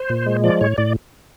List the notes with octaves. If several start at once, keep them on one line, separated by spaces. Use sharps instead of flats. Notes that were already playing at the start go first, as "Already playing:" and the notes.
Already playing: C5
A#2
G#3
F3 D5
A2 C#5
A2 D5